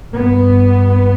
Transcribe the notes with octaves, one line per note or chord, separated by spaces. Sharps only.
G2 B3